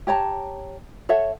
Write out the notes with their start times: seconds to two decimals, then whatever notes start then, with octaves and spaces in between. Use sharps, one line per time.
0.07 G4 C#5 A5 A#5
1.09 A4 C#5 E5 F#5